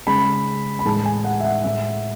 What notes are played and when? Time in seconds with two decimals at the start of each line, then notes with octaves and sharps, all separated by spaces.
0.07 C#3 G#3 B5
0.79 B5
0.85 A2 E3 G#3 A5
1.05 G#5
1.24 F#5
1.40 E5
1.44 F#5
1.64 A2 G#3 E5